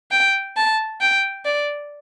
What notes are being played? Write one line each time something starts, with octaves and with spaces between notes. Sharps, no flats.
G5
A5
G5
D5